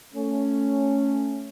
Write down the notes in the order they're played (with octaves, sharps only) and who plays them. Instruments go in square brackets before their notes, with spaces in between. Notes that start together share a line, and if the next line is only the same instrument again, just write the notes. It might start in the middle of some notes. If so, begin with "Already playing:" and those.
[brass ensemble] A3 C#4